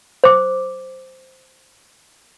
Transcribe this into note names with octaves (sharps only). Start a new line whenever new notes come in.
C5 D6